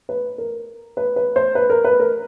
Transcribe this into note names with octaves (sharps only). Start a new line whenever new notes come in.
B4
A#4
B4
B4
C5
B4
A#4
B4
A#4